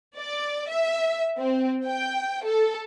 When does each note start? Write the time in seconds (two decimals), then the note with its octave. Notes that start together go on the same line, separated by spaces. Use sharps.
0.18 D5
0.70 E5
1.39 C4
1.86 G5
2.44 A4